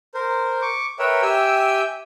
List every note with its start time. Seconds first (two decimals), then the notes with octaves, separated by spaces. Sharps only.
0.15 A#4 C5
0.62 C#6 D6
0.99 A#4 B4 C#5 E5 G5
1.22 G4 E5 G5 G#5 E6 G6